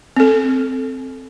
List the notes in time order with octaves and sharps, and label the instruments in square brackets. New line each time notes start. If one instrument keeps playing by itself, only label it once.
[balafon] C4 A4